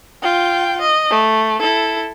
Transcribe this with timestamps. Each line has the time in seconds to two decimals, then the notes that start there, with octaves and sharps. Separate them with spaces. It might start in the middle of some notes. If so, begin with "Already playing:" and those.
0.22 F4 G5
0.81 D#5
1.10 A3
1.60 E4 A4